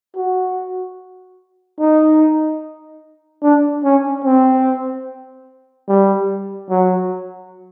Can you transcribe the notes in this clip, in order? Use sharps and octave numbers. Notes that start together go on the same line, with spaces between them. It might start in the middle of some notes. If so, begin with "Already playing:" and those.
F#4
D#4
D4
C#4
C4
G3
F#3